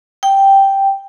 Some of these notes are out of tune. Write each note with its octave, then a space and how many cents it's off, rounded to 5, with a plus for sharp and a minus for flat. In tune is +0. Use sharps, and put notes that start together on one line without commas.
G5 +0